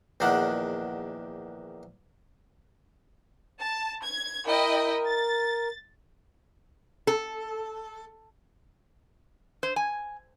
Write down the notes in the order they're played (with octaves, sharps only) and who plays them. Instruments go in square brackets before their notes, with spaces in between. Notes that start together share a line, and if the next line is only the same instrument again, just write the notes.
[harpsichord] A#1 E2 D#3 D4 F#5
[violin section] A5
G#6
[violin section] E4 D#5 G5 [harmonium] A#4
[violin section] A6
[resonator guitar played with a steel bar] A4
C5
G#5